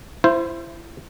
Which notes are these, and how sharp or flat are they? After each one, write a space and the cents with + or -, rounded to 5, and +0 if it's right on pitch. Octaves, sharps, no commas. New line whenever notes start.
E4 +30 C5 +0